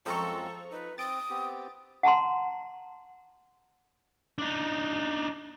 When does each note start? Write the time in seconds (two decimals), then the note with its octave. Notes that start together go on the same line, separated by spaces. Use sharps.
0.06 F#2 F3 G#3 C4 A4 A#5 C#6
0.72 D#4 B4
0.98 C4 D#6 A6 D7
1.30 B3 C4 G4
2.03 F#5 A5 A#5 C6
4.38 D4 D#4